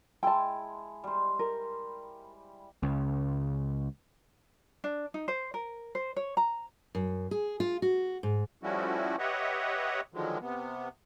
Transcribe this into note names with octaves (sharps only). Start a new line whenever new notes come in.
G#3 E4 G5 A5
G3 C5
A#4
C#2 C#3
D4
D#4
C5
A#4
C5
C#5
A#5
F#2
G#4
F4
F#4
G#2
F3 G3 A3 C#4 E4 F#4
G4 B4 C#5 D#5 E5 F#5
D3 D#3 F3 F#3 G#3
C3 B3